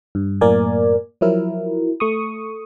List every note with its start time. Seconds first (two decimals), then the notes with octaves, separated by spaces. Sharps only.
0.15 G2
0.41 F#2 A2 A#3 A#4 D5 G#5
1.21 F3 F#3 E4 A#4
2.00 A3 C#6 D#6